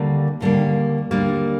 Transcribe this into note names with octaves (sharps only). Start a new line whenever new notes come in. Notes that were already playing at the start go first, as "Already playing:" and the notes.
Already playing: D#2 D3 G3 A#3
D#2 D3 G3 A#3
D#2 D3 G3 A#3